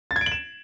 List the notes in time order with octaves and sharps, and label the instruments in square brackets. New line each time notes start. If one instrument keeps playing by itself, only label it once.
[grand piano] A6
G#6
D7
F#7
E7